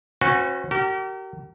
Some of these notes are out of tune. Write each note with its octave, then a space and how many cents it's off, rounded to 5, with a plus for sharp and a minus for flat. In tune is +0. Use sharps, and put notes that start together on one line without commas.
C#4 -35 F#4 -10 B4 +40
G4 -45 A#4 -25